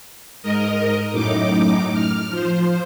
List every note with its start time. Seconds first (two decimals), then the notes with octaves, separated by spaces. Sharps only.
0.43 G#2 A#4 D#5
1.12 F#2 A2 D#4 D6
1.93 F6
2.30 F3 C5